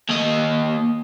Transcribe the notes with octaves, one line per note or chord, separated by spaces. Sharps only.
D#2 D#5